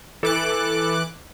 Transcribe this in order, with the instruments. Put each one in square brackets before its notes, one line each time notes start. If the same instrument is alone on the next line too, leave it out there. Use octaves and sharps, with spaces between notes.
[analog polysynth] E3 D6 F#6 [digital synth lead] A4